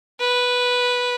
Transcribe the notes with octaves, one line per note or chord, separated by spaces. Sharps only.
B4